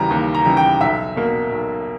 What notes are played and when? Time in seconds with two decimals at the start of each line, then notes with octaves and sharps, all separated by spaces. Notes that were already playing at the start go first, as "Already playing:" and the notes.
Already playing: D#2 C#3 E3 G3 A#5
0.11 D#2
0.34 A#5
0.46 C#3 E3 G3
0.57 G5
0.81 B1 E5
1.16 B2 A#3
1.52 B1